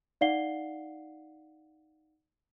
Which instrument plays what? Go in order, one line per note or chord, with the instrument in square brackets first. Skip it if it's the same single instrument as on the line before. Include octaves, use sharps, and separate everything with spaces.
[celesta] D#4 D5 F5 F#5 C7 G7